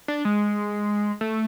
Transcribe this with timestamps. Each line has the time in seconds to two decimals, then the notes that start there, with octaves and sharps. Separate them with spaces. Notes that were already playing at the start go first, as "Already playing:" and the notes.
0.08 D4
0.25 G#3
1.21 A3